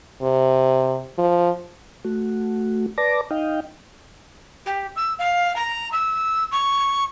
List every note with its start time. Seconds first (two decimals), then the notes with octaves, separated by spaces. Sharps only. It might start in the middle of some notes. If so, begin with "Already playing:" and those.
0.22 C3
1.18 F3
2.05 A3 F#4
2.98 B4 D5 A5 D6 A#6
3.31 D#4 D#5 F5 G5
4.66 G4
4.96 E6
5.19 F5
5.56 A#5
5.92 E6
6.51 C#6